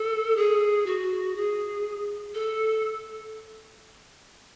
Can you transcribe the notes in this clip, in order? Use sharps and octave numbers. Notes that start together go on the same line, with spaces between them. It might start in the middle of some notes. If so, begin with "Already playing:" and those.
Already playing: A4
G#4
F#4
G#4
A4